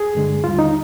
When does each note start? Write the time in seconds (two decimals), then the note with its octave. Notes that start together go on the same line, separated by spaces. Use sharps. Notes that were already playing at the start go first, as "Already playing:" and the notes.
Already playing: G#4
0.15 G2 D3 G#3
0.44 D#2 D3 G3 F4
0.59 D#4